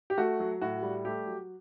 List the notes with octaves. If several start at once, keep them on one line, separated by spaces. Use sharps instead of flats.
G4
A3 F#4
F#3
A2 F#4
G3
A3 G4
F#3